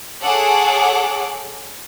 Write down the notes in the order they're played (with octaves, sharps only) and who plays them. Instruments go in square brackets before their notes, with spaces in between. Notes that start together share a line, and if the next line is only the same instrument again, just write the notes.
[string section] G#4 A4 C#5 F#5 D6